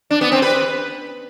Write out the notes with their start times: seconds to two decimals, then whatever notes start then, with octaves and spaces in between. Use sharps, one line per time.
0.11 D4
0.21 B3
0.32 C4
0.42 B4